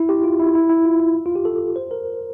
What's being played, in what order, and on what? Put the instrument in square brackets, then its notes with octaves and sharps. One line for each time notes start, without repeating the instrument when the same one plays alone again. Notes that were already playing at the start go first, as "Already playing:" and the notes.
Already playing: [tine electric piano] E4
G4
F4
E4
E4
E4
F4
E4
F4
G4
A4
C5
A#4